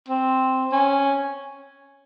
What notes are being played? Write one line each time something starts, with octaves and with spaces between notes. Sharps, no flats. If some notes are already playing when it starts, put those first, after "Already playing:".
C4
C#4